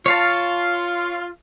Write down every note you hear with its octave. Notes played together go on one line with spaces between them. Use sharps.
F4 C#5 F5 A5